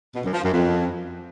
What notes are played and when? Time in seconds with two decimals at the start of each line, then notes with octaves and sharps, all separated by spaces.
0.14 B2
0.24 F#2
0.33 F3
0.42 F#2
0.52 F2